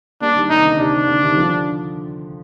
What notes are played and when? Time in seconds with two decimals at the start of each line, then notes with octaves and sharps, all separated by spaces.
0.21 G3 A#3 D4
0.36 D#3 G3
0.50 C3 D#3 D#4
0.65 D3
0.79 C3 D4
0.94 C3
1.08 D3
1.23 C3 D#3
1.32 G3
1.37 D3 F3